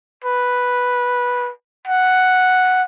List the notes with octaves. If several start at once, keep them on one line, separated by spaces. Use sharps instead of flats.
B4
F#5